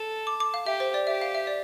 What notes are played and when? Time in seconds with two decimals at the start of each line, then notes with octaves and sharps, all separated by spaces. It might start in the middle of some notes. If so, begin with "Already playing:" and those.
Already playing: A4
0.27 D6
0.40 D6
0.54 F5
0.66 G4 E5
0.80 C5
0.94 D5
1.07 G4 E5
1.22 F5
1.35 E5
1.47 D5